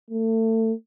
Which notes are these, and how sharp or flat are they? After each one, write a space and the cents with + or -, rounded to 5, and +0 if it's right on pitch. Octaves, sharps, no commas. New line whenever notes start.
A3 +30